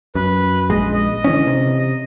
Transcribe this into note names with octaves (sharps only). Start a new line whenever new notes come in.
F#2 B4
A#1 G#3 D#5
D#5
D3 E3 C#4
C3